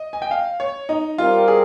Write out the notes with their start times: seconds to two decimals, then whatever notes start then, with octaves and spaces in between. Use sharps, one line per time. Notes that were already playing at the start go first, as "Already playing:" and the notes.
Already playing: D#5
0.13 G#5
0.22 G5
0.31 F5
0.60 C#5
0.89 D#4
1.18 G3 C4 F4 G4 A#4
1.48 G#4